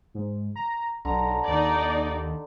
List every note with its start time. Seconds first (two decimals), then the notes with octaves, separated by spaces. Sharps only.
0.14 G#2
0.56 A#5
1.05 B1 D3 A#5
1.48 D#2 D#4 D5